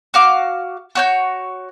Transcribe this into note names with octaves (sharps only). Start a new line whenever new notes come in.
F#4 F5 D6
F#4 C#5 G6